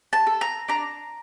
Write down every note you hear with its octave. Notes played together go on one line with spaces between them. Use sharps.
A5
A4
A#5
D4 A#5